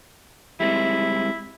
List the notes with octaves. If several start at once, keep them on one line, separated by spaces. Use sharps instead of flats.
G3 G#3 C4 E4